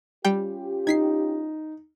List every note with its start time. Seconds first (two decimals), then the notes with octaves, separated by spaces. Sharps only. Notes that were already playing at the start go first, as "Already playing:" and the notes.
0.25 G3 C#4 F4 G4 G5
0.87 D#4 G#6 B6 C7